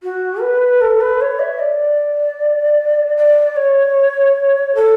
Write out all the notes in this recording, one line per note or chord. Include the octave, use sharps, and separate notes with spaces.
F#4
B4
A4
B4
C#5
E5
D5
D5
C#5
A4